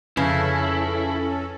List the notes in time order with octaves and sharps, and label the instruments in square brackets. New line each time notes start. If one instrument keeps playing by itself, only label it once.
[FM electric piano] F2 B4 A#6 [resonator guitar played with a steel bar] C#3 [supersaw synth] C#4 A4 [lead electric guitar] E4